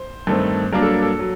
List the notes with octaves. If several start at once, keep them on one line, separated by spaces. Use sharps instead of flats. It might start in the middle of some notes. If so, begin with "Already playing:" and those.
Already playing: C5
G2 D#3 A3 C4
G2 F#3 A#3 D4 A#4
A4
A4
F#3